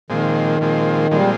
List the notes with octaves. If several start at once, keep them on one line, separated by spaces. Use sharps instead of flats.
A#2 D#3 F3 G#3 C4
A#2 F3 G#3 C4
A#2 F3 G3 G#3 C4